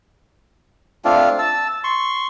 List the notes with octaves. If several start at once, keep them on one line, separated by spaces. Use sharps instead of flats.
A3 C4 D4 F4
A5 E6
C6 C#6